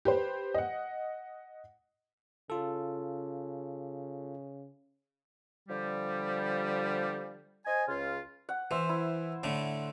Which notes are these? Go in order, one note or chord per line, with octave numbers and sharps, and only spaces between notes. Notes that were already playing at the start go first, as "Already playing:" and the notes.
G4 B4 C5
D#5 F#5
C#3 F4 A4
D3 F3 G3
C5 D#5 G#5
C#2 C#3 F4
F#5
E3 C5 E5
E4
A2 D3 A3